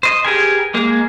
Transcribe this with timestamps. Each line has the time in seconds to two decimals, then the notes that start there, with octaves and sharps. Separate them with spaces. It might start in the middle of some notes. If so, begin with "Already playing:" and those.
0.03 C5 D#5
0.25 G4 G#4 A#4 B4 G#5
0.74 G#3 A#3 G#4